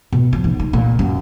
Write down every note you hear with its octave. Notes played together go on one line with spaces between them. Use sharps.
B2
F3
B1
D#3
A#2
F#2